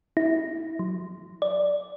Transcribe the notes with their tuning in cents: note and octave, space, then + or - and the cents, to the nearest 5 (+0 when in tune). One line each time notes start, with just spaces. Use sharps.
E4 -25
F#3 -30
D5 +0